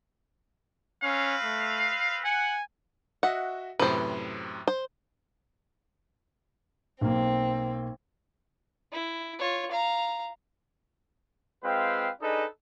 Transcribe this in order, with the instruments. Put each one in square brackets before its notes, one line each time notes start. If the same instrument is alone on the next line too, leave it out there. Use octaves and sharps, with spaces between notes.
[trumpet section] C4 B4 F5 [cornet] C#4
[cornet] A3
[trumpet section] F#5 [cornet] G#5
[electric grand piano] F#4 D#5 E5 [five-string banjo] F#5
[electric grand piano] F#2 A2 C3 [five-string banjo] B4 C5
[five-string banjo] C5
[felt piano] B1 A#3 [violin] C4
[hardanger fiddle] E4
F4 C#5
F5 A#5
[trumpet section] G#3 C4 F4 B4 F5 G5
D4 D#4 G#4 A4 B4 D#5